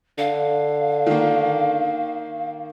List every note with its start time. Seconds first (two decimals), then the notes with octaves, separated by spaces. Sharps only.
0.18 D3 F5
1.06 D#3 A#3